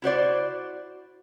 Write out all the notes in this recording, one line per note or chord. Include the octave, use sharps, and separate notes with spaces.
E4 F#4 C5 D5